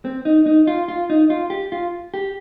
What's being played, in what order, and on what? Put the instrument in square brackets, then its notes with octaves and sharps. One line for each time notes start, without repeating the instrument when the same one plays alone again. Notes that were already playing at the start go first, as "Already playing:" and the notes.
[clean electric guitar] C4
D#4
D#4
F4
F4
D#4
F4
G4
F4
G4